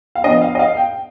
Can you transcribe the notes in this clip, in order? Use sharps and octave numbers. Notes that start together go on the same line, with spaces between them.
F5
F3 B3 D4 D#5
F5
D#5
F5
G5